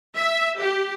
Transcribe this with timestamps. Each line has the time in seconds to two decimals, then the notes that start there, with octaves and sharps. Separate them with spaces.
0.17 E5
0.60 G4